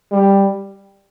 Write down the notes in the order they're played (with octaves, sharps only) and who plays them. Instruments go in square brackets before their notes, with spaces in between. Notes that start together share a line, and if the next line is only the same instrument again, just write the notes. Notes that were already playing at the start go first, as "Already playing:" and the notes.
[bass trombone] G3